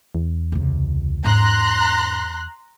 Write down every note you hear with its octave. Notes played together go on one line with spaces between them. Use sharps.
E2
C#2 C3
G#2 C#4 A#5 C6 F#6